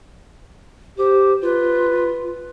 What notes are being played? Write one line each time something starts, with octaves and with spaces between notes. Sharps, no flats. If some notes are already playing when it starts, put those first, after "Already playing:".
G4 C5
F4 B4